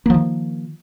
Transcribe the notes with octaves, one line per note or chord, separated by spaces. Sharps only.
D#3 F3 A#3